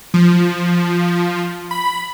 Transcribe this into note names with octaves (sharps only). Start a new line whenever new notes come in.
F3
B5